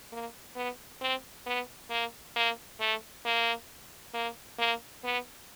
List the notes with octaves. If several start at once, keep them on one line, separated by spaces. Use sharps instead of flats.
A#3
B3
C4
B3
A#3
A#3
A3
A#3
A#3
A#3
B3